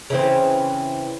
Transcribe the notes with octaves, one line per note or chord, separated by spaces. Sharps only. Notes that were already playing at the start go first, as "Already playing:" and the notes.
C#3 E3 C4